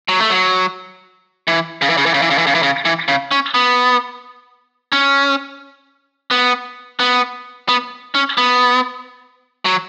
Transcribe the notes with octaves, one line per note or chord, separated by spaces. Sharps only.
F#3
A3
F#3
E3
C#3
E3
C#3
E3
C#3
E3
C#3
E3
C#3
E3
C#3
E3
C#3
C#4
B3
C#4
B3
B3
B3
C#4
B3
F#3